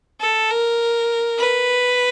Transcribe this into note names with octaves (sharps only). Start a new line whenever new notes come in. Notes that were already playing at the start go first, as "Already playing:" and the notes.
A4
A#4
B4